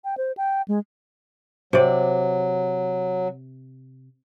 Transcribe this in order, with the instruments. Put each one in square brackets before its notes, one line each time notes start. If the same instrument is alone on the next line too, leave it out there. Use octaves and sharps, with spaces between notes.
[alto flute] G5
C5
G5
G#3
[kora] C3 D5 [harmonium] F#3